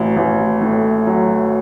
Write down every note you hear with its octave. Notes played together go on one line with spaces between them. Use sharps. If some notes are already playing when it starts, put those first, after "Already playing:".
Already playing: A1 F#3
A1
A2
F#3